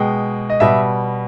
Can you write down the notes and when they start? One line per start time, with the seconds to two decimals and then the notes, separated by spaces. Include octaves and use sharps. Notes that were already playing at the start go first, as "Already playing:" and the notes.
Already playing: B2 G#3 G5
0.50 D#5
0.60 B2 G3 E5